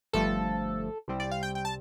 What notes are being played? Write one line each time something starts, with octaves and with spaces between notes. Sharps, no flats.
G1 G2 F3 A3 A4
C2 C3 G3 C4
D5
F5
G5
G5
A5